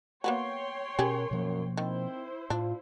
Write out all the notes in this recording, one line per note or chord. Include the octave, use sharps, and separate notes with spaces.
A#3 B3 F#4 C#5 G5 C6
B2 C#4 G4 G#4 A#4
F#2 B2 F3 A#3
D#3 C4 E4 C5
A2 D4 F4